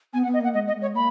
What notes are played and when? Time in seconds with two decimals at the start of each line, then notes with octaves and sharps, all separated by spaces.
0.13 B3 G#5
0.23 F#5
0.26 B3
0.33 D#5
0.40 A#3 F#5
0.54 G#3 D#5
0.67 D#5
0.74 G#3
0.81 C#5
0.94 A#3 B5